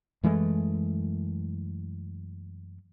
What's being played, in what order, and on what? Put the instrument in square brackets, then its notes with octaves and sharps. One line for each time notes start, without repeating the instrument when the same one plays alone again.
[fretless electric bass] F#2 E3 G#3 A3